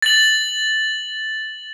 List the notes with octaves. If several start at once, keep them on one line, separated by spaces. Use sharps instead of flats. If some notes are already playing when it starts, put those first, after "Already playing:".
A6 F#7